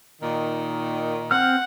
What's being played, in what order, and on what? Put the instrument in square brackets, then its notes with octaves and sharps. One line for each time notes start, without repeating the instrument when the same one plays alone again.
[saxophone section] A#2 D#3
[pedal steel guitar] C4 F6 [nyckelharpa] F#5